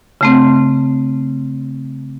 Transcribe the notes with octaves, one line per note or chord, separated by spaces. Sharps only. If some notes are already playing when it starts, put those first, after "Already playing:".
C#3 A3 C4